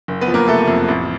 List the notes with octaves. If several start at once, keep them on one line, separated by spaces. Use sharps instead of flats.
F#1
B3 B4
F3
A#3 A#4
C3 A3 A4
F2
A1